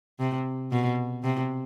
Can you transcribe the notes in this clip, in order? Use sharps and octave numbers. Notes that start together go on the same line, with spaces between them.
C3
B2
C3